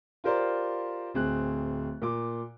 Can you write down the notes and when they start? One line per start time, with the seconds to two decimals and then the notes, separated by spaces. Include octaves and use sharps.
0.24 F4 G4 A#4 C5 D5
1.14 D1 C4 G#4 F#6
2.02 A#2 D6